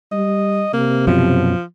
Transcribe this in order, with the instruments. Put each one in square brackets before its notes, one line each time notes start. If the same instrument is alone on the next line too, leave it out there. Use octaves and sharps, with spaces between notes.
[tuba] G3 [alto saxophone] D#5
[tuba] C3 [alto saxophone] A#3
[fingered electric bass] F#2 B2 [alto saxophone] F3